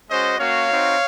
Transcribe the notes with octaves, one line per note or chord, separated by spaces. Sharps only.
G#3 C#4 F#4 C5 D#5
A#3 C#4 F#4 C#5 F5
C4 D#4 F#4